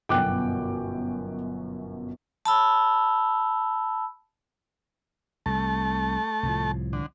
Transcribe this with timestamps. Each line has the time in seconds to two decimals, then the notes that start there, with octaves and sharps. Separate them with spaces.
0.09 G1 F#2 B2 G5 D6 F#6
2.46 A5 B5 E6
5.46 C2 A3 A5
6.43 C2 A2 F3
6.93 D3